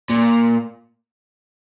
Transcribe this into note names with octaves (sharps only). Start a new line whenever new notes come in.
A#2